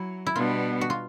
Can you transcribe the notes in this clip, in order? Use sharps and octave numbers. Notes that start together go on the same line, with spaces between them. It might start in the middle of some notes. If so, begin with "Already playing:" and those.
Already playing: F#3 E4
E4
B2 G3 B3 D4 F4
F#4
F4